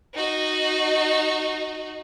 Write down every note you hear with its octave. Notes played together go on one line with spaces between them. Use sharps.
D#4 F#4